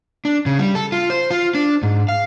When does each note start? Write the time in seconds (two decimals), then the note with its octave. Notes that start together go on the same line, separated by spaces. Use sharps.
0.25 D4
0.46 C#3
0.58 G3
0.75 A4
0.92 F4
1.10 C5
1.31 F4
1.55 D4
1.83 G#2
2.08 F5